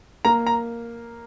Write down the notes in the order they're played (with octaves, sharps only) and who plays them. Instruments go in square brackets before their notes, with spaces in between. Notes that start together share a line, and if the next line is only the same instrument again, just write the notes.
[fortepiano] A#3 [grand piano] A#5
[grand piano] A#5